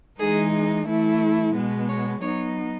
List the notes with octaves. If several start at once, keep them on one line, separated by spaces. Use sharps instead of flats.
E3 G#3 D#4 G#4
E3 A3 E4
B2 G#3 B3
C#5
F#3 B3 D#4 C#5